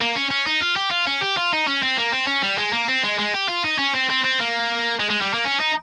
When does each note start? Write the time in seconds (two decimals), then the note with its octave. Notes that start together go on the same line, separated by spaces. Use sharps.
0.01 A#3
0.16 C#4
0.31 C#4
0.47 D#4
0.61 F4
0.76 G4
0.91 F4
1.07 C#4
1.21 G4
1.37 F4
1.53 D#4
1.67 C#4
1.83 C4
1.98 A#3
2.12 C4
2.27 C#4
2.42 G3
2.58 G#3
2.73 A#3
2.88 C4
3.03 G#3
3.19 G#3
3.34 G4
3.49 F4
3.64 D#4
3.79 C#4
3.94 C4
4.09 C4
4.24 C4
4.39 A#3
5.00 G#3
5.10 G#3
5.22 G3
5.34 A#3
5.45 C#4
5.60 D#4